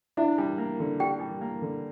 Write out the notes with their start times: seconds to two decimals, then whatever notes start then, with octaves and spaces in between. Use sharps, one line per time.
0.17 D4 E4 E5
0.38 G3
0.58 A#3
0.80 D3
1.00 D4 G4 G5
1.20 G3
1.41 A#3
1.62 D3